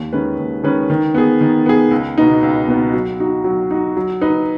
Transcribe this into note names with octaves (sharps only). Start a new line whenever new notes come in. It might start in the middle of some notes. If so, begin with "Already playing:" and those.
Already playing: D#2
D#3 G#3 C#4 B4
D#2
D#3 G#3 C#4 B4
D#3
B3 G#4
D#3
B3 G#4
C#2
B2 B3 D#4
C#2
B2 B3 D#4
F#3
D#4 F#4
F#3
D#4 F#4
F#3
D#4 B4